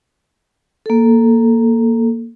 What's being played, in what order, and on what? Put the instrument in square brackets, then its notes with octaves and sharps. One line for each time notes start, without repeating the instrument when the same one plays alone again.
[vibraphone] A#3 A4